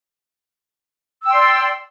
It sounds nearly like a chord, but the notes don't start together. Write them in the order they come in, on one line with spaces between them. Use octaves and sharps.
E6 G5 C6 D5